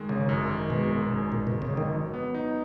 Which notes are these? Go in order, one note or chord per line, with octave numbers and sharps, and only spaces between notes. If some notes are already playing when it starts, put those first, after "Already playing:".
Already playing: F#2 D#3 G#3
G#1 C#3
F#2
D#3
B2 G#3
G#1
F#2
A#2 D#3
B2
G#3
C#3
G#1 D#3
F#3
B3
D#4